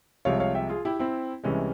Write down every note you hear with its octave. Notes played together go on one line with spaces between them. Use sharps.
C2 C3 F3 G#3 C#5 F5
C#5 F5
E5 G5
F4 G#4
E4 G4
C4 E4
C2 C3 E3 G#3 C#4